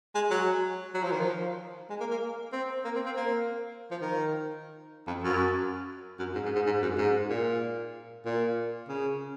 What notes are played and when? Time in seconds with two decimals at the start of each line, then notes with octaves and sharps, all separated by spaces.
0.15 G#3
0.31 F#3
0.94 F#3
1.03 F3
1.12 D#3
1.21 F3
1.90 G#3
2.00 A#3
2.11 A#3
2.53 C4
2.85 A#3
2.95 C4
3.06 C4
3.17 A#3
3.91 F3
4.02 D#3
5.07 F2
5.23 F#2
6.19 F#2
6.35 G#2
6.45 G#2
6.55 G#2
6.66 G#2
6.82 F#2
6.98 G#2
7.30 A#2
8.25 A#2
8.88 C#3